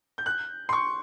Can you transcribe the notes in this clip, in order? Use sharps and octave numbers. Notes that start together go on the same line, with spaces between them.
G6
F#6
C6
C#6